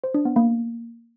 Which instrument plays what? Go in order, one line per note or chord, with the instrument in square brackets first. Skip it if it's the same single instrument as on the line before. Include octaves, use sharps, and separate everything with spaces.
[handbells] C5
D4
B3
A#3